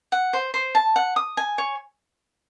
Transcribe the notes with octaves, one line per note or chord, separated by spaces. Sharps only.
F#5
C5
C5
A5
F#5
D#6
G#5
C#5